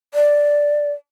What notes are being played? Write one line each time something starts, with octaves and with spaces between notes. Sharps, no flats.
D5